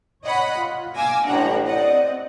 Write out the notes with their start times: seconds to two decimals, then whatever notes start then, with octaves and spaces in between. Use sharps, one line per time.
0.24 C#5 D#5 F#5 B5
0.59 F4
0.96 F5 G#5 D6 E6 A#6
1.25 A1 A2 D4 F#5 A#5
1.65 C4 D5 D#5 F#5